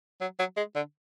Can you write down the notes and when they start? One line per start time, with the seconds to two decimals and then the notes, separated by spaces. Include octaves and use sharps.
0.21 F#3
0.39 F#3
0.57 G#3
0.75 D3